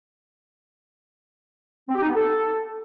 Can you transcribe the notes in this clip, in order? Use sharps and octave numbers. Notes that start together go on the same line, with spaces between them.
C4
G4
D#4
B3
A4